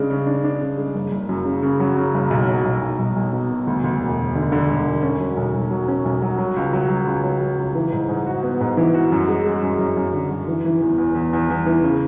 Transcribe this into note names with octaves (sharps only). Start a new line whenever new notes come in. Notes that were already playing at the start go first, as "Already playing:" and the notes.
Already playing: C#3 G#3 D4
C#3
D4
D4
C#3
G#3
F#1
F#1
F#2
C#3
C#3
F#3
C#3
F#1
B1
F#3
B1
B1
B1
B1
B2
B2
D2
D2
E1
E1
D3
D3
E1
E1
C#4
F#3
B1
B1
F#3
C#4
B1
F#3
F#3
C#2
F#3
F#3
C#2
F#3
F#3
C#2
E3
G#2
G#2
F#4
B3
G#2
E3
F#4
F#2
G#3
G#3
F#2
F#2
F#2
D3
F#2
E3
E3
E2
E2
E2
E2
E2
E3
C#3